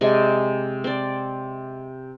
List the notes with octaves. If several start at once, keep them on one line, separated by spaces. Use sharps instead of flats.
C3 G#3 D5 G#5
C4 D5